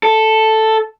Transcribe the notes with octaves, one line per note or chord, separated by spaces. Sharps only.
A4